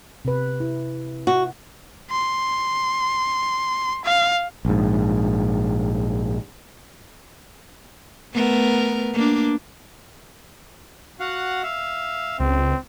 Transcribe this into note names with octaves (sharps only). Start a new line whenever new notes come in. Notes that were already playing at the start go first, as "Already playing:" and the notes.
C3 B4
E4
F#4
C6
F5
A#1 G#2
A3 B3 A#4
A#3 D4
F#4 F5 F#5
E5 F5
C#2 C4